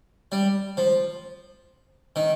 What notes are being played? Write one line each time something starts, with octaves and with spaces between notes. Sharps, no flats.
G3
F3
D#3